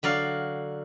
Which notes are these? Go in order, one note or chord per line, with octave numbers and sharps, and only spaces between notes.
D3 F#3 D5 F5